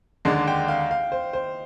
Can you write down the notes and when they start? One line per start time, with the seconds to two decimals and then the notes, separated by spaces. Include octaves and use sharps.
0.25 D#2 D3 G#3 D4 D#5
0.48 G5
0.68 F5
0.91 F5
1.12 C5
1.33 C5